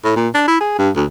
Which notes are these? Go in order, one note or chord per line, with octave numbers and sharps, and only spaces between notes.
A2
A#2
D4
E4
G#4
G2
D2